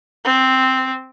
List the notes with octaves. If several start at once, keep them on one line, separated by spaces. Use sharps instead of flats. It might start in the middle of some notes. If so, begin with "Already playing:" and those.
C4